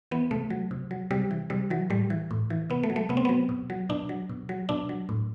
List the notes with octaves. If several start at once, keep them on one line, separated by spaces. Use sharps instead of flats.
E3 B3
C3 A3
F#3
C3
F#3
C3 G3
E3
C3 G3
E3 F#3
A2 G3
E3
A2
E3
C3 B3
A3
F#3
A3
C3 B3
C4
F#3 B3
B2
F#3
B2 D4
F#3
B2
F#3
B2 D4
F#3
A2